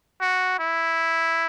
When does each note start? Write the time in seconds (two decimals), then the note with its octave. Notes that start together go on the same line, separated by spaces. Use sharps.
0.21 F#4
0.59 E4